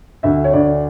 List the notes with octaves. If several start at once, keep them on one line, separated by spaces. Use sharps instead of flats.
D2 E5
C#5
D2 D5